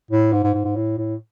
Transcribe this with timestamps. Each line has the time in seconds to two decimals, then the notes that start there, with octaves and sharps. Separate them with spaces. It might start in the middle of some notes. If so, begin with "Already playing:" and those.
0.11 A2
0.32 G#2
0.43 G#2
0.54 G#2
0.65 G#2
0.76 A2
0.98 A2